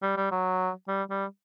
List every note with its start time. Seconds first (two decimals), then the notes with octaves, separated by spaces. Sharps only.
0.02 G3
0.17 G3
0.31 F#3
0.88 G3
1.10 G3